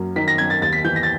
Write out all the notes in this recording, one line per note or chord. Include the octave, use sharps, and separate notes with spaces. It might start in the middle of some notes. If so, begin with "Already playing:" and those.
Already playing: F#2 F#3 A#3
D#3 B6
A#6
F#2 G#6
A6
D#2 A6
B6
E3 G6
A#6
A6